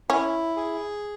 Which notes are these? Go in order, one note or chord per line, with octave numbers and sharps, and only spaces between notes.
C#4 E4
G#4